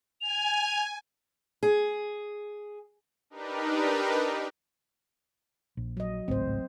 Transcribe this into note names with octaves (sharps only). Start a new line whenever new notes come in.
G#5 F7
G#4
D4 D#4 G4 A#4 B4
A#1
F#3 D#5
G#1 C#2 A2 C4 C5